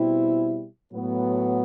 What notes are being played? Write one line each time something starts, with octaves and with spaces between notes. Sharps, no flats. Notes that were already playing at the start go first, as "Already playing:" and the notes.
Already playing: B2 G3 C4 E4
A2 F#3 B3